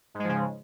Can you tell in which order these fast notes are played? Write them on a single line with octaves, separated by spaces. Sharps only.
G#2 G#3 F3 C#3